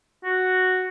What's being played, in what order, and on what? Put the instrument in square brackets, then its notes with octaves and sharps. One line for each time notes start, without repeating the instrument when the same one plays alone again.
[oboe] F#4